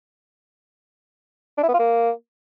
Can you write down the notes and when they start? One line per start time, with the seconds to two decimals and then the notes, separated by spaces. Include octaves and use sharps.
1.58 D4
1.63 E4
1.69 B3
1.74 F4
1.79 A#3